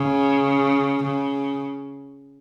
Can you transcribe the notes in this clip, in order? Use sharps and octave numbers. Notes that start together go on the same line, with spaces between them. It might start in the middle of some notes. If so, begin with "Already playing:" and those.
Already playing: C#3
C#3